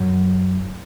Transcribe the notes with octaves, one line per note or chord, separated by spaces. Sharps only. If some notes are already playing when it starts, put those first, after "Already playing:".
Already playing: F#2